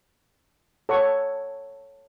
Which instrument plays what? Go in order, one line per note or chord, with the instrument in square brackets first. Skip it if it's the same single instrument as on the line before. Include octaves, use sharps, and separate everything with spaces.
[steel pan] A4 C#5 F#5 C#6